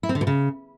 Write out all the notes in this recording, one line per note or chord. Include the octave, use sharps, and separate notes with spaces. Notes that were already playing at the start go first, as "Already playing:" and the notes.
E4
C4
D3
B2
C#3